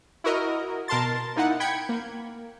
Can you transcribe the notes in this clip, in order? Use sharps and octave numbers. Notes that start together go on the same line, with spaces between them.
E4 F#4 A#4 D#5
B2 A#4 A5 C6 A6
A#3 D#4 E4 F#5
G5 B5 G#6 C#7
A#3